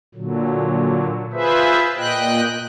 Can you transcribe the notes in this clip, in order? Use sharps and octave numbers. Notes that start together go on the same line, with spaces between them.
A#2 D3 F#3
F4 G#4 B4 C5 E5
A#2 D#5 G5 F#6